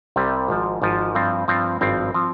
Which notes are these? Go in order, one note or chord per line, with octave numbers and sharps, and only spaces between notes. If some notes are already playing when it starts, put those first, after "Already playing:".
C2 C3 G3
G#1 G#2 F3
G#1 G#2 F3
G2 F3 C4
G2 F3 C4
G#1 G2 F3 C4
F3 C4